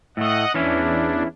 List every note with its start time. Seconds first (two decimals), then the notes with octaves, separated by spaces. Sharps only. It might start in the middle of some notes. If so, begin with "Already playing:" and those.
0.17 A2 A3 D#5 F#5
0.54 E2 E3 C#4 D4 E4